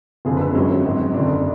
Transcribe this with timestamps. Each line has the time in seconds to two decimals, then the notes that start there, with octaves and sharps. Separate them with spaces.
0.25 F#1 F2 D3 F3 G#4
0.37 B4
0.41 A4
0.55 G#1 G#2 F#3 C#4
0.85 G#1 G#2 F#3
1.14 F#1 F2 D3 D4